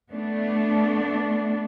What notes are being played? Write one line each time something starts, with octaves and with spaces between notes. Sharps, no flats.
A3 B3 D4